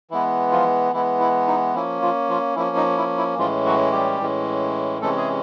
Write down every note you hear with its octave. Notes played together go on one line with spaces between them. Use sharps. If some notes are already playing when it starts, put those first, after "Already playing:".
E3 G#3 B3 E4
F3 F4
E3 G#3 B3 E4
E4
D#4
F3 A#3 C#4 E4
F3 F4
F3 F4
F3 A#3 C#4 E4
D#4
E4
E4
A2 E3 F3 G#3 C#4 F4
F#3 F#4
G3 G4
A2 E3 G#3 C#4
C3 E3 G#3 A3 C#4 A4
G#4